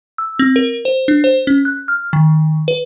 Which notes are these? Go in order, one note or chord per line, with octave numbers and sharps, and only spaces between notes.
E6
C4
A#4
C5
D4
C5
C#4
F#6
F6
D#3
B4